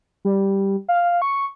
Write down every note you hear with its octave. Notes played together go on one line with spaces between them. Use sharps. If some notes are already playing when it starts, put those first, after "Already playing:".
G3
F5
C#6